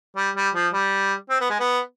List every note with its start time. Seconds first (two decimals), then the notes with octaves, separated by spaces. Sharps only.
0.16 G3
0.35 G3
0.54 F3
0.73 G3
1.30 C4
1.41 B3
1.50 G#3
1.60 B3